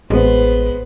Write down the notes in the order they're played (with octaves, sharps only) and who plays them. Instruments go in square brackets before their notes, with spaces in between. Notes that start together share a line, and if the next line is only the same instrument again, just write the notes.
[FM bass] A1 [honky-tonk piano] G#3 B3 [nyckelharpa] B4 C5